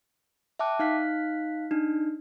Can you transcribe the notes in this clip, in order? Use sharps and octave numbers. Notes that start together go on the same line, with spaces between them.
E5 G5 A5 D6 F#6
D#4 F5 F#6 B6
D4 D#4